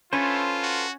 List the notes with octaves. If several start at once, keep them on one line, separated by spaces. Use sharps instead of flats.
A3 C#4 F4 A4 B4 C5
F#4